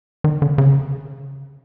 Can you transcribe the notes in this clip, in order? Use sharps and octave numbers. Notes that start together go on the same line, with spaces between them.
D#3
D3
C#3